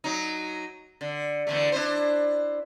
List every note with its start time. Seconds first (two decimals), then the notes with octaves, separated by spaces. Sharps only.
0.04 F#3 D#4
1.01 D3
1.47 E2 D3 A3
1.72 D4 E4 C5